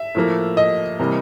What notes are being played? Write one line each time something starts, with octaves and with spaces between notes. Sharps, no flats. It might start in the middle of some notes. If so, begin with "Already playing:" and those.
Already playing: E5
A2 F3 A#3
D#5
C3 E3 G3 A#3